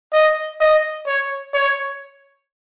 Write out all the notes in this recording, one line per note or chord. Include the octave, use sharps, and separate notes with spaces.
D#5
D#5
C#5
C#5